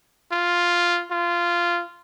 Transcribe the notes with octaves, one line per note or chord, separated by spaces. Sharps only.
F4
F4